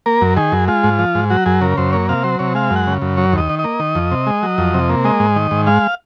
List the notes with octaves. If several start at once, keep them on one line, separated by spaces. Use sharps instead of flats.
A#3 A#4
F#2
D#3 G#4
F#2
G#3 F4
G#2
F3
G#2
F#3 F#4
F#2 G#4
C#3 A#4
F#2 C5
A#3 C#5
C3 F5
F#3 C5
C3 C#5
G#3 F5
F#2
F#5
C#3
F#2
F#3 C#5
D#2
D#5
D#3
D#5
A#3
D#3
F2
C3
G#3
F#3
F2
C3
A#3
G#3 D#5
G#2
D#3
G#2
G#3 F5